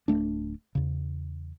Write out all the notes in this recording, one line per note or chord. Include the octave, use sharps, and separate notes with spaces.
D1 F#2 A3 D4
E2 C#3